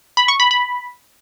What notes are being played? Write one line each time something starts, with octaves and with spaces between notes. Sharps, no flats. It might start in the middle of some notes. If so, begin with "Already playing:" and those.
B5
C#6
B5
B5